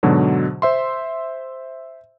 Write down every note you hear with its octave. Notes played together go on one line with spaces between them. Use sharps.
G#2 B2 D3 F#3
C5 E5 C6